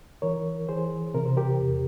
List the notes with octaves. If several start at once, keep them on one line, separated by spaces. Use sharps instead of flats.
E3 A#4 C#5
E3 G#4 C5
C3 A#4
C5
G4 A#4
E2